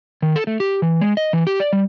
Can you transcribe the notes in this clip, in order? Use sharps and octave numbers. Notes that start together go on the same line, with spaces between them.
D#3
A4
A3
G4
E3
G#3
D#5
E3
G4
D5
G3